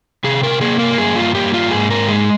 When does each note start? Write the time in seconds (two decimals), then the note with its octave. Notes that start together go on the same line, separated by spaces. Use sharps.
0.24 C3 G#4
0.43 A#4
0.61 A#3 G#4
0.79 A#4
0.98 G2 G#4
1.16 F4
1.35 A#3 G4
1.54 F4
1.71 G#2 G#4
1.90 A#4
2.08 G#3 G#4